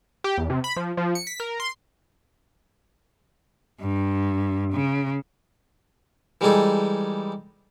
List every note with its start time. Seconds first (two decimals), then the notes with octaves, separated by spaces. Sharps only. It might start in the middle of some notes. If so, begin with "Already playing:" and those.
0.24 G4
0.38 E2
0.50 C3
0.64 B5
0.76 F3
0.97 F3
1.15 C#7
1.27 B6
1.40 A#4
1.60 C6
3.80 G2
4.73 C#3
6.41 E3 G3 G#3 D#4 G#4 A4